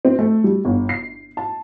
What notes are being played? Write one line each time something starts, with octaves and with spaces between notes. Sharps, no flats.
C4
A3
G3
G1
C7
A5